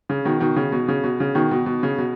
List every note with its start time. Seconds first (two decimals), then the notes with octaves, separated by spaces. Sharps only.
0.09 C#3
0.25 B2 D#3
0.40 B2 D#3
0.56 C#3
0.72 B2
0.88 C#3
1.04 B2
1.20 C#3
1.35 B2 D#3
1.51 B2
1.66 B2
1.83 C#3
1.98 B2